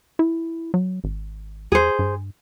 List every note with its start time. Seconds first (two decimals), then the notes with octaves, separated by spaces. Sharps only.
0.19 E4
0.74 F#3
1.04 G#1
1.72 E2 G#4 C5
1.99 G2